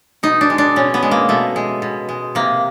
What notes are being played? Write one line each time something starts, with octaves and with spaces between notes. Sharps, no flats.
B2 D#4
D4
G#3
D4
B2 C#4
B3
G#3
A#3
B2 A3
G#3
B2
G#3
C3 A#3